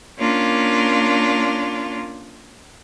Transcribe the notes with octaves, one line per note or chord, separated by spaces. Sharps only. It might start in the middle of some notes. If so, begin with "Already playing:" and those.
A#3 C#4 D4 F4